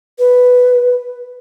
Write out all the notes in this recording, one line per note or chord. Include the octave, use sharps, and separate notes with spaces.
B4